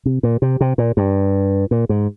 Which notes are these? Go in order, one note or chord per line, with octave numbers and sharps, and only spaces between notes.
C3
A#2
C3
C3
A#2
G2
A#2
G#2